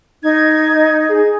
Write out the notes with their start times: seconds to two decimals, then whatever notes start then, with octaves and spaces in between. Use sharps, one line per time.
0.23 D#4 G#6
1.09 G#4